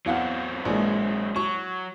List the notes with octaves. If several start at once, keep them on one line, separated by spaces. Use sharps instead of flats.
E2 F#3 C4 F5 F#5
A#1 E3 G#3
F#3 C#6